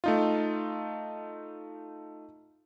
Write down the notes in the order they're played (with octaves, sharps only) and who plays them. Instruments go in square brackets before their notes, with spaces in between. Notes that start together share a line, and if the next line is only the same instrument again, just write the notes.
[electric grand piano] A3 D#4 F4